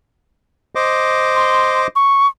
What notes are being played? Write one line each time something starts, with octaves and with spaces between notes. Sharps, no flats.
C5 D#5 D6
C6
C#6